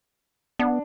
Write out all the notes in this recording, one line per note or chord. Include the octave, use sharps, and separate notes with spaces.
B3 D4